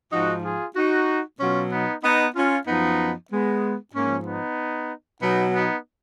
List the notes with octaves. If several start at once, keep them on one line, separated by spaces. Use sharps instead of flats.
G#2 F3 D#4 F#4
F4 G#4
D#4 F#4
B2 F#3 C#4 F4
B3 D#4
B3 D#4
C#4 F4
F#2 F3 B3 D#4
G#3 B3
G#2 F3 A#3 C#4
B3 D#4
B2 F#3 B3 D#4
B3 D#4